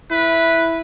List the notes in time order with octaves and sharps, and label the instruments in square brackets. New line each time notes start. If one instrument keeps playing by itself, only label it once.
[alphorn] E4 [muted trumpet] B4